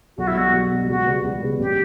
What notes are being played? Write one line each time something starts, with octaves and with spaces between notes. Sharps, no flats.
B1 F#4
E4
B2 G3 F#4
B1
B2 G3
C#2 F#4
C#3 G3 B3
C#2
C#3 G3 B3
A1 G4